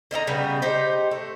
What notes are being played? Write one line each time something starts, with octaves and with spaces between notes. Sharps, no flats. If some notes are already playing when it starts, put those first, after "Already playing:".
D3 D#4 E4 A#5
C#3 G3 B3
D#4 G4 C5
A3